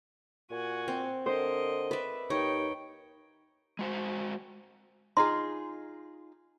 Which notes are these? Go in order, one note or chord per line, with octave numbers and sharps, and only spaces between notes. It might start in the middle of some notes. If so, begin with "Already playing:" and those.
A#2 F#4 G#5
C4
D3 A#4 C5 D#5
B4 D5 E5
D#2 D#4 C#5 G5
G#3 F#4 C5
D#4 F4 G#4 D#5 C6